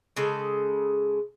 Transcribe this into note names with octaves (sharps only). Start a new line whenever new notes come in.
C#3 G#3 A4